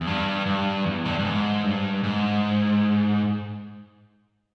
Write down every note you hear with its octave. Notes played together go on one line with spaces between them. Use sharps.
E2
G2
G2
E2
G2
G2
G#2
G2
G#2